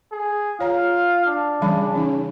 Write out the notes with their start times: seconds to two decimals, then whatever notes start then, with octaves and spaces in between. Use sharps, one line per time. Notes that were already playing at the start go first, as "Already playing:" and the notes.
0.12 G#4
0.60 F4 C#5 F5 A#5
1.26 D4
1.61 C#3 E3 G3 B5
1.93 E3 C#4 D#4